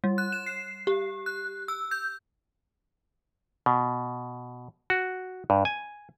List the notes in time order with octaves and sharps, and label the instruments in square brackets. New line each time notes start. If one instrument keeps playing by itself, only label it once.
[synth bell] G3
F#6
E7
C7
G4
F#6
E6
G6
[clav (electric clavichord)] B2
F#4
G2
G#5